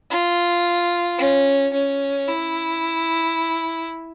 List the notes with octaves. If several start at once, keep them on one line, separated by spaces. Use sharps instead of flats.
F4
C#4
C#4
E4